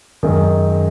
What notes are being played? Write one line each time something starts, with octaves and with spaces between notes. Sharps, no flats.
F#2 D#3 G#3